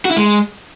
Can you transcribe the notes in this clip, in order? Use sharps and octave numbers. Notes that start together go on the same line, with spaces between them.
F#4
E4
G#3